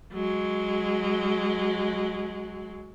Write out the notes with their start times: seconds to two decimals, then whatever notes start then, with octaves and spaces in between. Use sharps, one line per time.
0.13 F#3 G#3